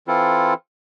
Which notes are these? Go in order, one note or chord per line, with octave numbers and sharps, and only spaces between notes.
E3 C4 E4 F4 A4